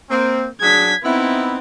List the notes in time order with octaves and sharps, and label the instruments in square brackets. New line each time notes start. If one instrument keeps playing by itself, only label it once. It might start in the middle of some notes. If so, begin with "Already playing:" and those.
[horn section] A#3 C4
[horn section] F#3 D4 G#4 [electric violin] G#6 B6
[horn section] B3 D#4 E4 [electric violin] C4